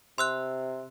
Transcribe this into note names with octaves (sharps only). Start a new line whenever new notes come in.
C3 C6 E6 F#6